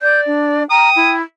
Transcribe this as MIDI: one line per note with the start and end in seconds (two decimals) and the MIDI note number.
0.01 0.63 74
0.01 0.21 91
0.26 0.68 62
0.70 1.16 79
0.70 0.90 82
0.70 1.11 87
0.96 1.22 64